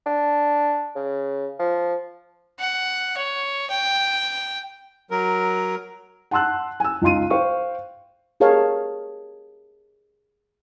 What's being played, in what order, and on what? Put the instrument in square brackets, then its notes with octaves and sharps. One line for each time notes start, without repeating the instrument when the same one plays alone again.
[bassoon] D4
C#3
F3
[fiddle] F#5
C#5
G5
[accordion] F#3 A#4
[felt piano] F#5 A5 C6 E6 F#6
G#5 E6
C#2 D#4 F5 C6 D#7
C5 F5 G5 C#6
[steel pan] G4 G#4 A#4 C#5 F5 A5